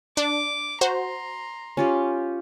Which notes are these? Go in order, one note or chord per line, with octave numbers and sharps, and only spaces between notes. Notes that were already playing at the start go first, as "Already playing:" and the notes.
D4 D6
F#4 C5 A#5 C6
C#4 F4 G4